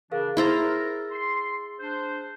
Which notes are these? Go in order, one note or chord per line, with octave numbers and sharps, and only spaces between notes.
C#3 E3 D4 G#4 A#4 F5
E4 G#4 A#4 C5 A#5 E6 A6
C6
D4 C5